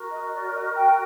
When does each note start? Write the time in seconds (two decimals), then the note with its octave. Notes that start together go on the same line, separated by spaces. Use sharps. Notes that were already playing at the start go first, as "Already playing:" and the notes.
Already playing: F#4 A#4
0.11 D#5
0.32 D5
0.44 D5
0.53 D#5
0.74 G5